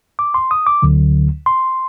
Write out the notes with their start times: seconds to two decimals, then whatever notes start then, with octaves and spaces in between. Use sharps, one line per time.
0.19 D6
0.34 C6
0.51 D#6
0.67 D6
0.82 D2 D3 F#3
1.46 C6